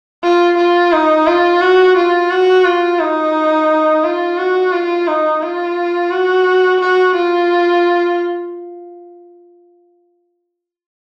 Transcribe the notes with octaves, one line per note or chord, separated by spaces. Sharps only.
F4
F4
D#4
F4
F#4
F4
F#4
F4
D#4
F4
F#4
F4
D#4
F4
F#4
F#4
F4